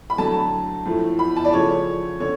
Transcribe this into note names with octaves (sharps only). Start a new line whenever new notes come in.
B5
D3 F#3 A3 A5
A2 F3 A3
B5
A5
D5
C#3 F3 A3 C#5
D3 C#5